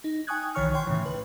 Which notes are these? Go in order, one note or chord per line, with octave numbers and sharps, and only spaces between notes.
D#4
G5 G#5 C#6 D#6 F#6 G#6
B1 D#3 E3 C#5 C#6 F6
C#5 G5 C6
A2 C#3 E3
B4